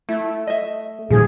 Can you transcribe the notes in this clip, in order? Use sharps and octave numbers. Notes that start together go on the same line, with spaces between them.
A3 E4
D#5 E5
A#2 D#3 F3 G3 G#4